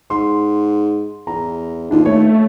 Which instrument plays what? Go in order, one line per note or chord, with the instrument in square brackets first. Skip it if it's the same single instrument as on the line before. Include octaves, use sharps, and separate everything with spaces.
[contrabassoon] G#2 [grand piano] C6
[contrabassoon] E2 [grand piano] A#5
[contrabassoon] D#2 [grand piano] D4 F4
[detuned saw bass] A3 [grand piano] C#5